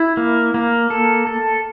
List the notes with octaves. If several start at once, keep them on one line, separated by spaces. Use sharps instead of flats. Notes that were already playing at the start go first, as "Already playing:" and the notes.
Already playing: E4
A#3
A#3
A4
A4